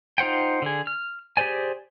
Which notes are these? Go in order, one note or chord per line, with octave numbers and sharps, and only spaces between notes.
D#4 F4 C5 F#5 G5
D3 G#4
F6
G4 G#4 C5 D5 G#5